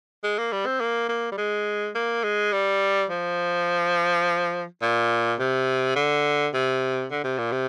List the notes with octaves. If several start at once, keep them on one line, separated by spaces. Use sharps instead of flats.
G#3
A#3
G3
C4
A#3
A#3
G3
G#3
A#3
G#3
G3
F3
A#2
C3
D3
C3
D3
C3
A#2
C3